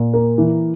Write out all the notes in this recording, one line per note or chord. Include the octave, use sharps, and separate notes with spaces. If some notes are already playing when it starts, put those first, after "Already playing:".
Already playing: A#2
A#3
E3